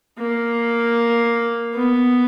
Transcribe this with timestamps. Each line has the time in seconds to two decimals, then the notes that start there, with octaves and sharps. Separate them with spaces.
0.19 A#3
1.74 B3